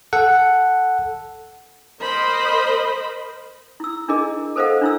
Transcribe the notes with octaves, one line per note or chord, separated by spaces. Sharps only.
A4 F#5
A#4 C5 D#5 B5
E4 E6
D4 E4 G#4 A#4 D#5
A4 A#4 C5 D#5 F5 F#5
D4 E4 E6